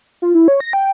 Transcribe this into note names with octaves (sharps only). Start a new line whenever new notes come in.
F4
E4
C#5
A#6
G5